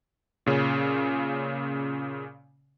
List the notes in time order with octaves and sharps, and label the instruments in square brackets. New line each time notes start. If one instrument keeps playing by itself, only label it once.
[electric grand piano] A#2 C#3 C#4